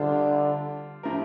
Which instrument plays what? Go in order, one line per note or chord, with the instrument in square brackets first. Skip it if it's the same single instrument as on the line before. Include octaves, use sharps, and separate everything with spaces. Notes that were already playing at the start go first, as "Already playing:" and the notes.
Already playing: [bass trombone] D3 [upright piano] G3 D4 F4 C5
[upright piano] A2 F3 C4 G4 A#4